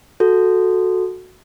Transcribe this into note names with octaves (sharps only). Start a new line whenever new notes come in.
F#4 A4